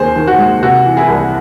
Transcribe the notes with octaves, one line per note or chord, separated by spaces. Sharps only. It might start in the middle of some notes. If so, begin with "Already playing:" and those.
Already playing: D#2 C#4 G#4 C5
D#3
F#4
G#3
C3 F#4
E3
E4 G#4
C2